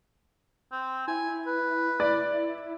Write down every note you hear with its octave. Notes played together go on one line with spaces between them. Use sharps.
C4
E4 G#5
B4
D5